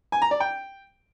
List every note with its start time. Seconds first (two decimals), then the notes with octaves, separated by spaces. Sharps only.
0.12 G#5
0.22 A#5
0.31 D5
0.40 G5